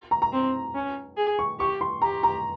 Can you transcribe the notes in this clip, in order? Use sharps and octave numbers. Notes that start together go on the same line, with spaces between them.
A#5
A#5
C4
C#4
G#4
C#6
G4 C#6
C6
G4 A#5
A#5